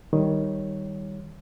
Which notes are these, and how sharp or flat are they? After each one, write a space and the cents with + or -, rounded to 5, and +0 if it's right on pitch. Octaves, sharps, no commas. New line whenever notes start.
D#3 +0 G3 +0 C#5 +0